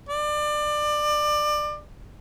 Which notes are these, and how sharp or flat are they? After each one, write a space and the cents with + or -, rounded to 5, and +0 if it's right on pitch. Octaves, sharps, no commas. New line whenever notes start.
D5 +25